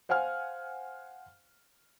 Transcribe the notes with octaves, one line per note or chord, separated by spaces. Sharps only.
C5 F5 F#5 G#5 F6